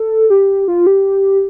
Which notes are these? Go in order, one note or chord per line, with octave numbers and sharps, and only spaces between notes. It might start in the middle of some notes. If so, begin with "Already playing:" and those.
Already playing: A4
G4
F4
G4